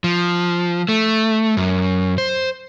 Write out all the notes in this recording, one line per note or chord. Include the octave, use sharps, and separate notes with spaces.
F3
A3
F#2
C5